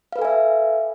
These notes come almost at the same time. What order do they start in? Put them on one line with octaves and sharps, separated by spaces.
F5 B4 A4 G#5 E5